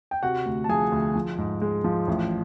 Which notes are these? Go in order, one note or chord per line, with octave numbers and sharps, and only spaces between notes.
G5
C3 F#4 F#5
D2
A5
F3 G#4 G#5
D2
F3
G#2
G#3
F3
A1